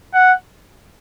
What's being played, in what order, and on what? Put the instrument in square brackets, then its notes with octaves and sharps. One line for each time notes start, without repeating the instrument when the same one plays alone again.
[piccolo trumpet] F#5